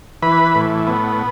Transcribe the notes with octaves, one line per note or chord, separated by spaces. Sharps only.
E3 B4 B5
A2
B3